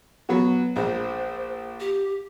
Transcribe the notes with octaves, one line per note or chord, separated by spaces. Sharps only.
F#3 B3 F#4
A#1 G#3 C5
G4